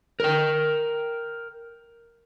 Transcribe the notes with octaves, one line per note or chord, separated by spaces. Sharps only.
A#4 G5